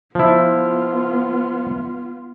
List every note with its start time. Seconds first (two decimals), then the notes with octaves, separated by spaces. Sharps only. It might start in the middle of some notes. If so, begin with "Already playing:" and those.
0.15 F3 B3 E4 F4